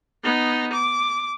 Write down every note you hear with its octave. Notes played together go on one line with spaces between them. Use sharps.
B3 D#4
D6